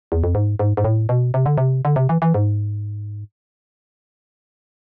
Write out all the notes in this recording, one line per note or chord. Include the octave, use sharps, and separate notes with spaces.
E2
F2
G#2
G#2
G#2
A2
B2
C3
D3
C3
D3
C3
E3
E3
G#2